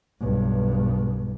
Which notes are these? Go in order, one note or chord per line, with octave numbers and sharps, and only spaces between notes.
B1 G2